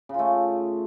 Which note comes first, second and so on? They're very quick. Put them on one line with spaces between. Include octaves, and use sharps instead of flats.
C#3 F4 A3